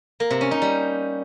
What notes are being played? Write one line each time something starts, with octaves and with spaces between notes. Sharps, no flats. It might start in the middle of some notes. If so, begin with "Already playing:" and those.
A#3
C3
C#4
D#4
G3